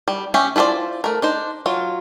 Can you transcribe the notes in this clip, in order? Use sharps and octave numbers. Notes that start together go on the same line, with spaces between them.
G3
C#4 G4 E5 G#5
E4 F4 A4 C5 D5
A3 A#4
D4 D#4 C5
F#3 F4